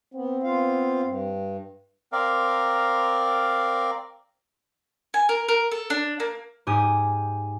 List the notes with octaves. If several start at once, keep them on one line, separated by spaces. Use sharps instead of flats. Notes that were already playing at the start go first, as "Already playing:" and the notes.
B3 C4
B3 F4 F5
G2
C4 A#4 D5 F5
G#5
A#4
A#4
A4
D4
A#3
G#2 G4 G#5 D#6